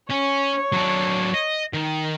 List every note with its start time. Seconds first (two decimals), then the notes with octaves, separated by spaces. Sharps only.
0.11 C#4 C#5
0.72 F#3 D4
1.34 D#5
1.74 D#3